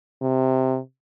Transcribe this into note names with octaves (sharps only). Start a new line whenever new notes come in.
C3